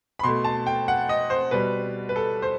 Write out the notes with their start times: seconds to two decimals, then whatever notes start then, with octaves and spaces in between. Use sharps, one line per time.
0.19 B5
0.23 B2 A3 C6
0.45 A5
0.66 G5
0.88 F#5
1.09 D#5
1.30 C5
1.51 B2 G3 B4
2.09 B4
2.16 A4
2.42 C5